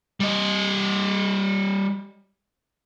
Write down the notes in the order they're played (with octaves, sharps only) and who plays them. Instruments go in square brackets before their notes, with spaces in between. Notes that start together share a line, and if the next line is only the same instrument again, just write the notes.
[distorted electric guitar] G3 D#5